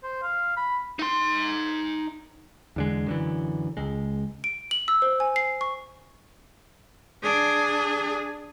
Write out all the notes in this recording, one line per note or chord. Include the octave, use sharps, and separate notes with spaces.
C5
F5
B5
D#4 C6
E2 D3 G#3
F#2 D3 E3
C#2 G#3
D7
F#7
E6
C5
G#5
C7
C#6
D4 G#4